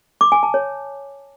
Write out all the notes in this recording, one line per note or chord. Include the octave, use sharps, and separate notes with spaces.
D6
G#5
A5
C#5